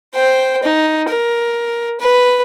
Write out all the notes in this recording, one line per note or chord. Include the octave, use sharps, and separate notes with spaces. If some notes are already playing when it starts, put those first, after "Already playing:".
C5 G5
D#4
A#4
B4